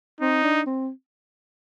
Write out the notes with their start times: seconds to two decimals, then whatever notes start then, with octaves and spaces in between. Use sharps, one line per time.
0.21 C4 D#4
0.43 D4
0.66 C4